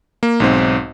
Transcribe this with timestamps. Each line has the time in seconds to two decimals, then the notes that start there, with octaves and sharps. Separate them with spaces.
0.23 A#3
0.40 B1 G#2 C4